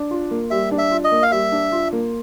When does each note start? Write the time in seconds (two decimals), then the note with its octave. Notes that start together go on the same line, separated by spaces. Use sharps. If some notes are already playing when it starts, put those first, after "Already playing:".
Already playing: D4
0.11 F4
0.31 A#3
0.50 G3 E5
0.71 D4
0.78 E5
0.91 F4
1.04 D#5
1.12 A#3
1.22 F5
1.32 G3 E5
1.52 D4
1.72 F4
1.93 A#3